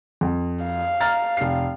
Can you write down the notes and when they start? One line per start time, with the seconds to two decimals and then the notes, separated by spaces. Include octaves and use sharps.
0.21 F2
0.64 F5
1.01 A#5 F6 A6
1.37 F1 C7